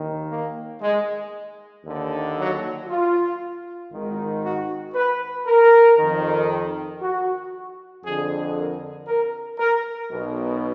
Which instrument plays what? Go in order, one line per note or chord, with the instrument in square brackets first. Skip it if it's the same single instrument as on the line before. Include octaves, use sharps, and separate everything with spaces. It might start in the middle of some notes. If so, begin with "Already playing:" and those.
Already playing: [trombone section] D#2 D#3
A#3
G#3
D#2 D3
F#3
F4
G#1 G#2 D#3
F#4
B4
A#4
F2 D#3
F#4
F2 D3 G#4
A#4
A#4
A#4
B1 B2